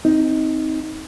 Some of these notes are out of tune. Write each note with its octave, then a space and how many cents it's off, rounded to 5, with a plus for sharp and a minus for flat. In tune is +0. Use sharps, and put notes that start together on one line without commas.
C4 +0 D#4 +15